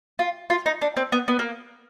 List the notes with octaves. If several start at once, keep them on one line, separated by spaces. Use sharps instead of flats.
F4
F4
D#4
D4
C4
B3
B3
A#3